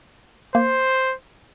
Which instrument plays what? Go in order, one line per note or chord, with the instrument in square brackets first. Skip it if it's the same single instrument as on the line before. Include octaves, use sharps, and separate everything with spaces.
[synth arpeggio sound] A#3 [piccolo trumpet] C5